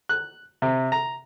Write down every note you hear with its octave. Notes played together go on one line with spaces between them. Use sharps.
F#6
C3
A#5